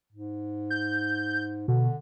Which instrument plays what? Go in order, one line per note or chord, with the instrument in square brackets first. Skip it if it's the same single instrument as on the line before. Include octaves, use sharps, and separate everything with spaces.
[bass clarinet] G#2
[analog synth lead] G6
[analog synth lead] B2 [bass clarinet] D3